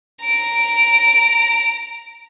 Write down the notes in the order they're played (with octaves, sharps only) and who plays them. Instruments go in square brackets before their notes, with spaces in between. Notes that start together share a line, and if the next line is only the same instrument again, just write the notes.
[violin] A#5 D7